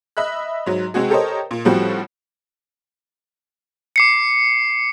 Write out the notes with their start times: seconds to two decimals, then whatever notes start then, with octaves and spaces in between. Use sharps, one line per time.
0.17 D#5 E5 B5 F#6
0.66 G#2 F#3
0.94 C3 G#3 C4 F#4 G#4
1.10 G4 A4 A#4 C5 C#5 D#5
1.51 A#2
1.65 A2 F3 G3 C4 F#4
3.96 D6 C7 C#7